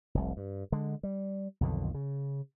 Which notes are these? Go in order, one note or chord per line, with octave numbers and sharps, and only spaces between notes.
F1 C2
G2
D3 G#3
G3
B1 F2 D3 D#3
C#3